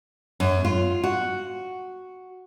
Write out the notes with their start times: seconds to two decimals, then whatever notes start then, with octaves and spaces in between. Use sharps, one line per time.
0.40 F#2
0.65 F4
1.04 F#4